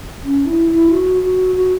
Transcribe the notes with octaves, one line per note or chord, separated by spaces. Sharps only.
C#4
E4
E4
F#4
F#4
F#4